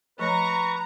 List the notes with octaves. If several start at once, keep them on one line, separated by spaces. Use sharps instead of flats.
F3 A3 B4 C#5 A#5 C#6